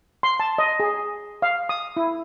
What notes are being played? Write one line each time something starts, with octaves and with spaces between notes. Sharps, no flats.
C6
A5
D#5
G#4
F5
D#6
E4